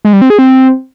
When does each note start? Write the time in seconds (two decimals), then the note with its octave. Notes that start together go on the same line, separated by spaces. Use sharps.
0.05 G#3
0.13 G3
0.22 C4
0.30 G#4
0.39 C4